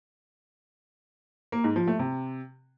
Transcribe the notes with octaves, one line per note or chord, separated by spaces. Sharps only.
A#3
G#2
F3
A3
C3